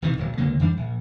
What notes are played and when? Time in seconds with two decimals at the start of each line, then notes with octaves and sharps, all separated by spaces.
0.02 B1 C3 D#3 E3
0.18 D1 A#1 F#3
0.38 C#2 D3 F#3 A#3
0.59 F2 E3 G3 D4
0.77 A#1